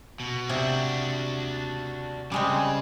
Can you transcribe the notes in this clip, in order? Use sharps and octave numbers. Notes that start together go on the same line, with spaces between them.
B2
C3 D4 F#4
C#3 G3 G#3 C4